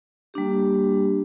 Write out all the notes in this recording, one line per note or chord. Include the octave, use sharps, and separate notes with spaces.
G3 A#3 D4 G4